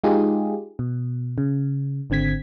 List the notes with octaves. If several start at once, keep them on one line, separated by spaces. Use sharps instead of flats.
G#3 D#4 F4 G4 G#4
B2
C#3
G#1 D3 C4 G#6 B6